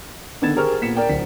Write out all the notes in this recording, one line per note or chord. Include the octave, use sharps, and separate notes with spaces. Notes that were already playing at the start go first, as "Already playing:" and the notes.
D3 D#3 B3 G#6 A6 E7
G4 G#4 A#4 C5 C#6 F6
A#2 B3 B6 C#7 E7
A#4 D5 G5
D1 B6